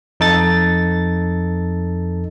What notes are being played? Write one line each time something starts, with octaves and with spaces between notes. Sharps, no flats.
F2 D#4 A4 A6